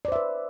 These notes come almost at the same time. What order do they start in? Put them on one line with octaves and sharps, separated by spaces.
D5 C5 E5 B4